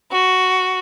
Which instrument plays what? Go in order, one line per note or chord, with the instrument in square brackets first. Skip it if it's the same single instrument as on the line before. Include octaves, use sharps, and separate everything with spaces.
[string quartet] F#4